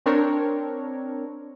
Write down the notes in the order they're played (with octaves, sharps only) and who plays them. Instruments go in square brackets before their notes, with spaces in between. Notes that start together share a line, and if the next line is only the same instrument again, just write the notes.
[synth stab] C4 D4 A#4 C#5